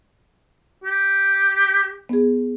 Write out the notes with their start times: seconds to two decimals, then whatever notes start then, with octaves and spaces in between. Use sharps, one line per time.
0.84 G4
2.09 B3 G#4